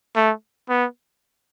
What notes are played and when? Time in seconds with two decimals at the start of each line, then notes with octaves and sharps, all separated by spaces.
0.16 A3
0.69 B3